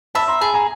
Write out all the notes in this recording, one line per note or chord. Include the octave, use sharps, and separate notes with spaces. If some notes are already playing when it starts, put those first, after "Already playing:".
E5 A5 B5
A#5 C6
G#4 A5 B5
G#5 A#5